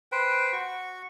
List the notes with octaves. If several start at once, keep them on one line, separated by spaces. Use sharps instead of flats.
B4 C5 G5
F#4 C#6